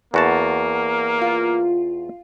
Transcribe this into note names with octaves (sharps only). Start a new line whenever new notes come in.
E2 A#3 F#4 A5
F4